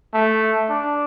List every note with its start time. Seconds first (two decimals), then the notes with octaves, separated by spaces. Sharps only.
0.14 A3
0.69 D4